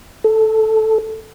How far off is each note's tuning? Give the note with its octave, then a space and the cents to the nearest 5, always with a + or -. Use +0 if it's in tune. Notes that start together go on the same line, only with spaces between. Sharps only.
A4 -5